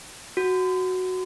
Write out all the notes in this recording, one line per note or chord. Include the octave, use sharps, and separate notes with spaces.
F#4